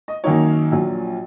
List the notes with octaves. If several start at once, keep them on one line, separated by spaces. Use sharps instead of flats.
D#5
F#2 D#3 A#3 D#4 C#5
A#1 A#2 F#3